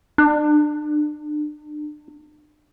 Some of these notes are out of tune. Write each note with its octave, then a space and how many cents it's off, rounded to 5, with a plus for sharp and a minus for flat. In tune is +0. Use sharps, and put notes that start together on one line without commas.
D4 +35